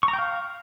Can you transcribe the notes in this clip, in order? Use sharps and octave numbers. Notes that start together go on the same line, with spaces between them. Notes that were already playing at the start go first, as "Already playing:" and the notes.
C#6
A#5
G5
F5